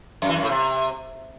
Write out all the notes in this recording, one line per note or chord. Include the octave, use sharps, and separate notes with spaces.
F#2
E3
F#2
A2
C3